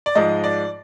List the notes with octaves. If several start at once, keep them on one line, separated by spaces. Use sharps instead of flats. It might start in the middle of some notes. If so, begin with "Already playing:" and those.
D5
G#2 F3 G#3 D#5
D5